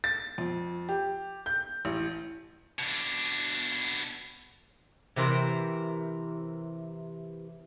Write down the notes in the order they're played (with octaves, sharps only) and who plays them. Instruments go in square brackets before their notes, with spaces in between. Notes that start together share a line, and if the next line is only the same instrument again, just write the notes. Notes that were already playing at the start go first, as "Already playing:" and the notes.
[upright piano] A6
F2
G4
G6
A1
[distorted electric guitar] B2 D4
[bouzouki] C3 E3 A#4 C5